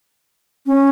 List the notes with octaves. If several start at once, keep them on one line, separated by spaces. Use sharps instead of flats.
C#4